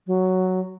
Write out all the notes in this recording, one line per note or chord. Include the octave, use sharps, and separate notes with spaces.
F#3